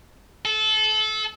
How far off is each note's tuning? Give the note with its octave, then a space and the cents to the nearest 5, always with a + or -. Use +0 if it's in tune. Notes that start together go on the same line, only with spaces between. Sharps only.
A4 -25